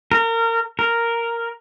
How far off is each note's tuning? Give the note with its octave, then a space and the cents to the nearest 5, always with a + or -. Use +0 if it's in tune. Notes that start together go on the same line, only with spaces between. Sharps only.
A#4 -30
A#4 -5